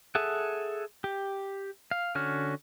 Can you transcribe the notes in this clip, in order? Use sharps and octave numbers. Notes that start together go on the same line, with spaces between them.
G#4 A4 E5 F#5
G4
F5
D3 C#4 F#4 F6